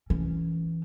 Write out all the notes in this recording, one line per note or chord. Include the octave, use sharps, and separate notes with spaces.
E3 C#4